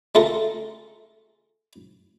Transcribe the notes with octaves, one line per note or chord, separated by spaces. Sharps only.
G#3 A3 F4 A4 A#4